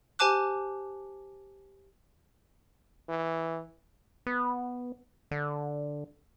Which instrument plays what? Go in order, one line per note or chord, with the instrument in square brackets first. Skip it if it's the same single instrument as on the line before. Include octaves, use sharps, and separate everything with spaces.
[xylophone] G4 C5 G#5 A5 D6 F#6
[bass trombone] E3
[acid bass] B3
D3